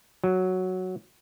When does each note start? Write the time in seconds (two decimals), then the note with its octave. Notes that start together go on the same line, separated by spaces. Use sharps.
0.24 F#3